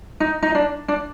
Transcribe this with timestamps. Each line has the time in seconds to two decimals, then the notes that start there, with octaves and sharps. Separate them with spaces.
0.20 D#4
0.43 D#4
0.55 D4
0.88 D4